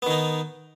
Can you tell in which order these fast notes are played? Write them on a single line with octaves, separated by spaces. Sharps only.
B3 D#3 D#4